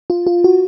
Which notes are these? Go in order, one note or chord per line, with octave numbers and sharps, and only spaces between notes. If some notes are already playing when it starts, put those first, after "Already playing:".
F4
F4
F#4